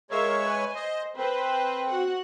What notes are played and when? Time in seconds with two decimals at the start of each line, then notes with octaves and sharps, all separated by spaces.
0.11 G#3 A#4 C#5 E5 F5
0.43 B4 G#5
0.75 C5 D#5
1.17 C4 B4 C5
1.89 F#4 F#5